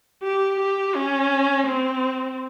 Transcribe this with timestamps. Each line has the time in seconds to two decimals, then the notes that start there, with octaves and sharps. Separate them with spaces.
0.23 G4
0.59 G4
0.95 C#4
1.67 C4